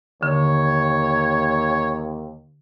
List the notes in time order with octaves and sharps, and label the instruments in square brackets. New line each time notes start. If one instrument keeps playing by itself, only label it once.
[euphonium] D#2 [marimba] D3 [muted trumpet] C#5